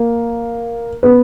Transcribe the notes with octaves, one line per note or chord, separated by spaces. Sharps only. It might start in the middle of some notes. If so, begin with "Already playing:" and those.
Already playing: A#3
B3 B4